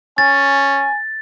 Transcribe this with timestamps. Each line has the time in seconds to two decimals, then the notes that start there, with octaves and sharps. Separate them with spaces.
0.18 C#4 G#5 A6